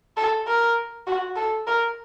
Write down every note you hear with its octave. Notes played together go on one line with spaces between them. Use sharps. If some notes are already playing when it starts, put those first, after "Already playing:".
A4
A#4
F#4
A4
A#4